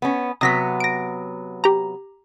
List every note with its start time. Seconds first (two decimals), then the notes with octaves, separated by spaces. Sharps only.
0.02 B3 C#4
0.41 C3 F#3 B3 D#6 A#6 B6
0.80 A#6 D7
1.64 G4 A#5